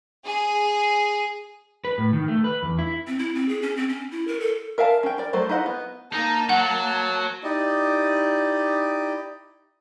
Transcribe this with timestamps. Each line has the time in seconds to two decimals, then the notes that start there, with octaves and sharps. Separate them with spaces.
0.25 G#4
1.85 B4
1.98 A2
2.13 D#3
2.28 A3
2.44 B4
2.63 E2
2.79 E4
3.07 C4
3.19 E4
3.35 C4
3.49 G#4
3.62 C#4
3.77 C4
3.89 C#4
4.11 E4
4.28 A#4
4.40 A4
4.78 A#4 E5 F5 G#5 A5
5.03 C#4 G5
5.18 A#4 D5
5.33 F#3 A3 A4 C5
5.49 D#4 E4 D#5 F#5
5.66 B3
6.13 A#3 D#4 A5
6.49 F#3 F#5
7.44 D#4 E4 G4 D5 D#5